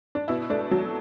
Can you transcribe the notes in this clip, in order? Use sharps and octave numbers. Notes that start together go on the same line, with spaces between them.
D4
B2 E4
A3 D4
F#3